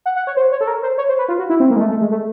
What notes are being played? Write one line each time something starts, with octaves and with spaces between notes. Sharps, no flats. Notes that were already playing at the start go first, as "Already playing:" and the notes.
F#5
F#5
C#5
C5
C#5
A4
A#4
C5
C#5
C5
B4
F4
F#4
E4
C4
A#3
G#3
A3
A3
G#3
A3